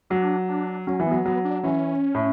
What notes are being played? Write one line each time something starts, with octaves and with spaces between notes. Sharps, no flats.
F#3 D4
D4
F#3 C#4
E3
F#3 B3
F#3 B3
D4
E3 C#4
A2